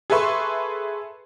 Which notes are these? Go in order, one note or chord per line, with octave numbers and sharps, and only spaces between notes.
G#4 A4 B4 E5 C6 C#6